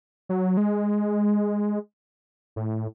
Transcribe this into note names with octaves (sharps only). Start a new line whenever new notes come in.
F#3
G#3
A2